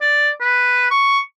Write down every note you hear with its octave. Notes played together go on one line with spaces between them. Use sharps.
D5
B4
C#6